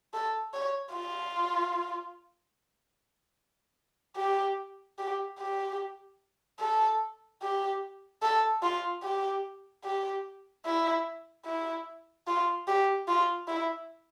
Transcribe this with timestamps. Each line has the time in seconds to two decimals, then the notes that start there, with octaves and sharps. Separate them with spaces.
0.14 A4
0.54 C#5
0.94 F4
4.17 G4
4.99 G4
5.39 G4
6.60 A4
7.42 G4
8.22 A4
8.63 F4
9.03 G4
9.84 G4
10.65 E4
11.46 E4
12.27 F4
12.68 G4
13.08 F4
13.48 E4